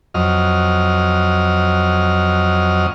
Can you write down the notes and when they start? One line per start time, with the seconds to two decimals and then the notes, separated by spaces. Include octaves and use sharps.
0.14 F2 F#3 D#5 F6